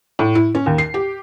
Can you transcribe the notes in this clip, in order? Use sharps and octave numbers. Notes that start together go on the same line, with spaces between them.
A2
E4
C#4
D#2
C7
G4